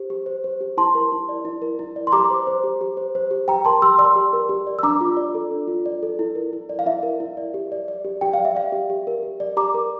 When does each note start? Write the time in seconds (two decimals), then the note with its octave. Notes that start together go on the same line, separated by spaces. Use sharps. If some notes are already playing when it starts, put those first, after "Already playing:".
Already playing: G4 C5
0.10 G4
0.26 C5
0.44 C5
0.61 G4
0.77 E4 A5 C6
0.95 A#4
1.12 E4
1.29 D5
1.45 E4
1.62 A#4
1.79 E4
1.96 D5
2.07 C6
2.12 G4 A#5 D6
2.30 C5
2.47 C5
2.64 G4
2.81 G4
2.97 C5
3.15 C5
3.31 G4
3.48 G4 G5 A#5
3.65 A#4 A5 C6
3.82 G4 C6 E6
3.98 D5 C6 E6
4.16 G4
4.33 A#4
4.49 G4
4.67 D5
4.79 E6
4.83 D4 A#5 D6
5.01 F4
5.17 D5
5.35 A4
5.51 D4
5.68 F4
5.86 D5
6.03 A4
6.19 E4
6.35 A#4
6.53 E4
6.69 D5
6.79 F5
6.86 E4 E5
7.03 A#4
7.20 E4
7.37 D5
7.54 G4
7.72 D5
7.88 D5
8.05 G4
8.21 G4 G5
8.33 D5 F5
8.45 E5
8.55 D5 F5
8.72 G4
8.90 G4
9.07 A#4
9.23 G4
9.40 D5
9.57 G4 A#5 D6
9.74 A#4